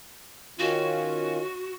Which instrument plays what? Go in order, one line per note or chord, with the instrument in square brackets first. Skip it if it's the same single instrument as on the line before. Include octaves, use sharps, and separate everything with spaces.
[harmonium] D#3 C#4 F4 [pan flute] F#4